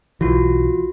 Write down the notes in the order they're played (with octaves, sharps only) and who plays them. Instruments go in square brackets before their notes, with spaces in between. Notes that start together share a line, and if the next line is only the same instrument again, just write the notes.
[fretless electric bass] B1 E3 [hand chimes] F4 F#4